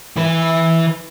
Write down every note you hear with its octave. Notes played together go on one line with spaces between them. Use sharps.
E3 B4